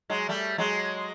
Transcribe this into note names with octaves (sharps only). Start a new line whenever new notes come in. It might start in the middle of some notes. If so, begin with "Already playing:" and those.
F#3 G#3
G3 A3
F#3 G#3